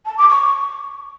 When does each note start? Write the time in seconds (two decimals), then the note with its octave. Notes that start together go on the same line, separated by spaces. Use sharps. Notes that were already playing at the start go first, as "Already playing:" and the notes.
0.06 A5
0.17 D6
0.29 C#6